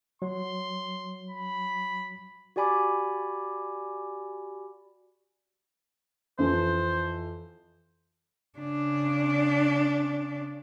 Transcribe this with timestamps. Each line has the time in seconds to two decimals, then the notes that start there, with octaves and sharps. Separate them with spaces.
0.22 F#3 C6
1.30 B5
2.56 F#4 G4 D5 G#5 B5 D6
6.38 F2 E3 F3 C5
8.58 C#3 D4